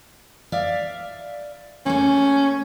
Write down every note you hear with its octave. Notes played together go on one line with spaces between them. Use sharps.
D5 E5 F5
A3 A#3 C#4